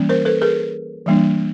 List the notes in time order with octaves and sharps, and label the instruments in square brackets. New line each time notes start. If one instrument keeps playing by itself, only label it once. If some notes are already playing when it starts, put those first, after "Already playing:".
Already playing: [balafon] E3 G3 A#3 C#4
A#4 C5
A4 B4
G#4 A#4
E3 G3 A#3 D4